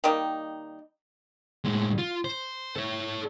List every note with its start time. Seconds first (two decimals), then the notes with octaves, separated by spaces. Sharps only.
0.04 D#3 G3 A#3 D#4
1.65 A2 G#3
1.98 F4
2.25 C5
2.76 A4 C#5